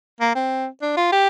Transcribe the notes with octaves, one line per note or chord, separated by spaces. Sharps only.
A#3
C4
D4
F4
G4